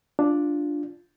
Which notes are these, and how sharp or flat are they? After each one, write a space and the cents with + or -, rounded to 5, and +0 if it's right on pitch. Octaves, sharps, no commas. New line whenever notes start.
D4 +0 F4 +0